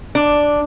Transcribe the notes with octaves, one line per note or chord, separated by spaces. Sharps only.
D4